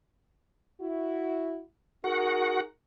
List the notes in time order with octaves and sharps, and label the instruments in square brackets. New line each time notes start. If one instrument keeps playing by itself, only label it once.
[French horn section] E4 F#4
[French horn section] D#4 G#4 A#4 [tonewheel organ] F#4 F#5